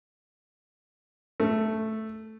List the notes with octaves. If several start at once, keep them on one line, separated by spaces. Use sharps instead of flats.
A3